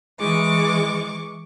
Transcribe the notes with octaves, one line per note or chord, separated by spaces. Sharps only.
E3 G#3 C#6 D6